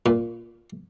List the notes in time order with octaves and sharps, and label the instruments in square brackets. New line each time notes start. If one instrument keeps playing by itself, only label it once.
[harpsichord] A#2